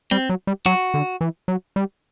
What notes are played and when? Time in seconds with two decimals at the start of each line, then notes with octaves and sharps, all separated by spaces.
0.11 G3 C4
0.29 F#3
0.47 G3
0.66 F#3 F#4
0.94 D3
1.21 E3
1.48 F#3
1.76 G3